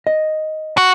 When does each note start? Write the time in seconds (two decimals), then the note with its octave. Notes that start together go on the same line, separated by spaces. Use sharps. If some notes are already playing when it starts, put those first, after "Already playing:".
0.07 D#5
0.78 F#4